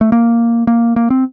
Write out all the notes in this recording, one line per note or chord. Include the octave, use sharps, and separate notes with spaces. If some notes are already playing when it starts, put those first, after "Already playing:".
A3
A#3
A#3
A#3
C4